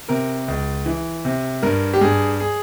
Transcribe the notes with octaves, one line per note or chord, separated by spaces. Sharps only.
C3 A#4
C#2
E3
C3
G2 A#4
G4
G2 G#4
G#4